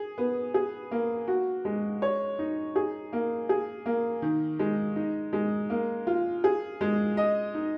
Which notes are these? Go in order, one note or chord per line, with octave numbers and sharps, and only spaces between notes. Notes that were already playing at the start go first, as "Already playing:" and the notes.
Already playing: G#4
B3
G#4
A#3
F#4
G#3
C#5
D#4
G#4
A#3
G#4
A#3
D#3
G#3
D#4
G#3
A#3
F4
G#4
G#3
D#5
D#4